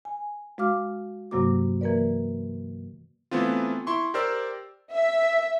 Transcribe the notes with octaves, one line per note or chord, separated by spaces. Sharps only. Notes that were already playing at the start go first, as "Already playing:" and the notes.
G#5
G#3 F#4 F5 D6 F6
G2 C3 F#3 A#3 F#4 D6
E3 A#3 A#4 B4 D5
E3 A3 B3 C4 F4
E4 C6 C#6
G4 A#4 C5 D5 E6
E5